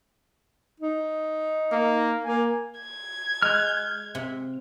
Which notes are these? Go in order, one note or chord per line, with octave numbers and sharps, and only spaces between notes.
D#4
A#3
A#3 G#5
G#6
G#3 F6 F#6
C3